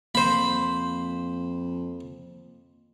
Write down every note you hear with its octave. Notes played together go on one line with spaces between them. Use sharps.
F2 A#3 C5 B5